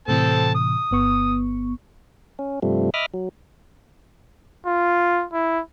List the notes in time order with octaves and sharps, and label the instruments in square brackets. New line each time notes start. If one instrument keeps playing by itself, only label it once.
[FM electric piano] A2 C3 E3 [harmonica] C4 A4 A5
[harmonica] D#6
[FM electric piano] G1 B3 C#6
[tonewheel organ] C#4
G2 C3 F3 G3 A3
D#5 E5 B5 D6 D#6 F6
F#3
[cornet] F4
E4